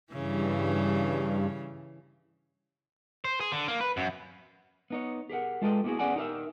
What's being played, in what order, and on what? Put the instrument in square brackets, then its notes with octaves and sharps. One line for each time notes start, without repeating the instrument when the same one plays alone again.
[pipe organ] G2 [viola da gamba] C#3 E3
[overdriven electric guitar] C5
G#4
D3
A#3
B4
F#2
[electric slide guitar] B3 D#4 C#5
G4 G#4 A#4 F#5
G#3 F4 A4 B4 D#5 G5
A#3 B3 E4 F#4 G#4
B3 C#4 G#4 D5 F#5 G#5
D#4 G4 A#4 E5